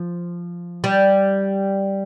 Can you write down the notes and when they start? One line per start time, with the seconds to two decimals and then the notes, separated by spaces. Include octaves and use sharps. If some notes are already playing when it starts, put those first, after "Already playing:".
Already playing: F3
0.84 G3